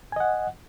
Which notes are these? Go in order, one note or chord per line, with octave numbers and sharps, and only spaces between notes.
D#5 F#5 G#5